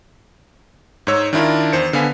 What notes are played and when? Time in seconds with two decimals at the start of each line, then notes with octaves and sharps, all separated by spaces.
1.07 G#2 D#4 C#5 E6
1.33 D#3 D4 E4 F4 A#4
1.73 E2 C5 C#7
1.93 D3 B3 F5 G#5 B6